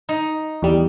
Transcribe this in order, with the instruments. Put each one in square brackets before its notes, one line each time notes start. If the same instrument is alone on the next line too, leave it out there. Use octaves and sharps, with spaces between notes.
[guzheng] D#4
[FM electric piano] E2 G3